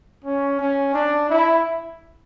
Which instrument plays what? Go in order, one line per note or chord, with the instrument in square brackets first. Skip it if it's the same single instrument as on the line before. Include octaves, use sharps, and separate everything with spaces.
[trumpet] C#4
C#4
D4
E4